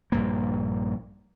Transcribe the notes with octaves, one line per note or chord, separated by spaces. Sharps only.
A#1 G2 A#3